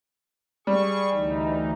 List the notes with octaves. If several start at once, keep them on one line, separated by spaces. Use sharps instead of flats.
G3 G#4 C#6
D2 E3 D#4